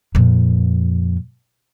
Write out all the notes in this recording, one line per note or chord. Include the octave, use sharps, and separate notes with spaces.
F2 A#2